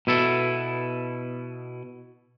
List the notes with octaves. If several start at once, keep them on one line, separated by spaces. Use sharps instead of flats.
B2 E4 A4